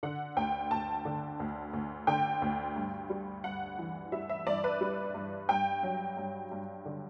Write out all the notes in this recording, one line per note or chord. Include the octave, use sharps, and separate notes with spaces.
D3 F#5
D2 G5
D2 A5
D3
D2
D2
D3 G5
D2
G2
G3
G2 F#5
E3
G3 E5
E5
G2 D5
B4
G3
G2
G2 G5
F#3
G2
G2
D3